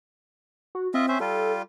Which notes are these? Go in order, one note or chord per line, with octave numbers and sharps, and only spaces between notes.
F#4
C4 F4 D#5 E5
C#4 C5 E5
G3 F4 A4